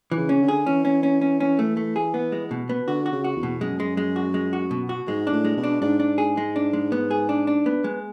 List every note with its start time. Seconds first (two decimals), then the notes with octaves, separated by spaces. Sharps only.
0.12 E3
0.17 C#3
0.29 C#4
0.42 D3
0.48 G#4
0.66 E3 C#4
0.85 C#4
1.03 C#4
1.21 C#4
1.40 C#4
1.59 A3
1.77 A3
1.96 G#4
2.14 B3
2.32 G#3
2.51 B2
2.69 B3
2.87 D3 F#4
3.06 F#4
3.12 C#3
3.24 F#4
3.36 E2
3.43 B2
3.61 F#2 G#3
3.80 G#3
3.97 G#3
4.16 F#4
4.34 G#3
4.53 F#4
4.71 B2
4.89 F#4
5.08 G#2 G#3
5.27 D4
5.32 A2
5.45 G#3
5.57 B2
5.63 D4
5.82 G#2 D4
6.00 D4
6.18 G#4
6.37 G#3
6.56 D4
6.73 G#3
6.92 B3
7.11 G#4
7.29 D4
7.47 D4
7.66 B3
7.84 G#3